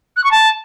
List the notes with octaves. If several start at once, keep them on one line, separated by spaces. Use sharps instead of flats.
F#6
C#6
A5